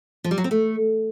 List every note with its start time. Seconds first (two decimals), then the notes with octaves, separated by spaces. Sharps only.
0.24 F3
0.31 G3
0.38 F#3
0.44 C4
0.51 A3